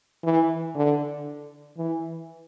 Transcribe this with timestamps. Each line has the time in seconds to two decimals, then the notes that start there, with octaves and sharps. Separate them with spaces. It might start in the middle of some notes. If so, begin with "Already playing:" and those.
0.24 E3
0.75 D3
1.77 E3